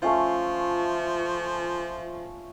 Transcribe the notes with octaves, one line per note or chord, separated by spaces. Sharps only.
F3 A3 C#4 F4